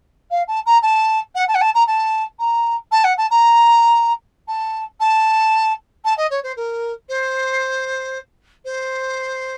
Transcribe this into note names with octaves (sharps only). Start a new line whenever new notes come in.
F5
A5
A#5
A5
F#5
A5
F#5
A5
A#5
A5
A#5
A5
F#5
A5
A#5
A5
A5
A5
D#5
C#5
C5
A#4
C5
C5